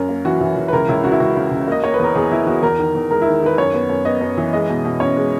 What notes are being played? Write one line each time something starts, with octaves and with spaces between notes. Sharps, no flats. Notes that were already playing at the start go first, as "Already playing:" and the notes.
Already playing: F#2 C#4 A#4
A#3
E3 F#4
E3
E3
B4
C#2 A#4
C#2 E4
C#3 F#4
E4
C#2 F#4
C#3
C#2
A#3 D#5
A#3 C#5
B4
E2 A#4
E2 G#4
E2 E4
E2 F#4
E2 A#4
D#3
E2
G#3 A#4
E4
D#3
D#3 B4
F#2 C#5
B3
F#2
B3 D#5
F#2
E3
G#3 D#5
B2
B2
C#4 C#5
G#3